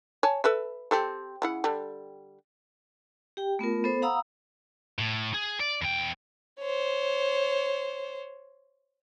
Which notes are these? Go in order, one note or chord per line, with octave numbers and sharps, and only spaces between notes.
C#5 G#5 A5
A4 B4 E5
C4 G4 A4
C#3 E4 F#5
D3 G3
G4 G5
A3 B3 F4 A#4
B3 A4 C5
F5 F#5 A#5 B5 D#6 E6
A2
G#4
D5
E2 G5
C5 C#5